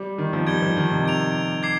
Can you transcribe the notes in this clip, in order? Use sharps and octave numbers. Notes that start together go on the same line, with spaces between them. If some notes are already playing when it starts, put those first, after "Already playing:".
Already playing: G3
D#3
F3
G3 G#6 D7 G7
F3
D#3
C3
G#6 D7 F7
D6 G#6 C7